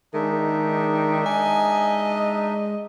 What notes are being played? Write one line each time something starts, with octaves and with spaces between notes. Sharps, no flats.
D#3 G#3 D4 D#4 E5
D#5 G#5